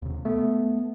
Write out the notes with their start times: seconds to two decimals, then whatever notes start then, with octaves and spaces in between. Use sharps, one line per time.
0.02 D#2 C3
0.25 A3 B3